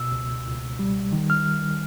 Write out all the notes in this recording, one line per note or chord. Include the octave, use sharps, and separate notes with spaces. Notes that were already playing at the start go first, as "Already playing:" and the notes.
Already playing: B2 E6
C#2
C#2
G3
D#3
F6